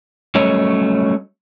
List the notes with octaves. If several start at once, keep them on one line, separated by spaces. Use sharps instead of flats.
F#3 G3 A3 C#4 C#5 D#5